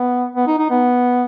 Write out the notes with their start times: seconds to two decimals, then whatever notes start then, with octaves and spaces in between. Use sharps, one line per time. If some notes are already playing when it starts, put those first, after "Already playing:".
Already playing: B3
0.35 B3
0.47 D#4
0.59 D#4
0.70 B3